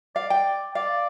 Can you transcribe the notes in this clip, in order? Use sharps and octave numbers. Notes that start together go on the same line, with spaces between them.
D5 F5
G5
D5 F5